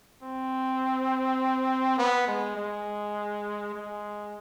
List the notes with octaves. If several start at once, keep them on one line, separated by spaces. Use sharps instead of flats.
C4
B3
G#3
G#3
G#3